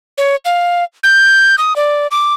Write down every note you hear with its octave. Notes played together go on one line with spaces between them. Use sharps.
C#5
F5
G6
D#6
D5
D6